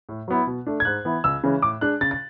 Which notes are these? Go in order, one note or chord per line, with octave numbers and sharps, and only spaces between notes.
A2
F#3 B3 E4
B2
A3 D4
G#6
G#2 F#6
E3 B3 E4
C#2 E6
C#3 E3 G#3 C#4
A2 D6
G#3 D4 F#6
C#3 A6
A6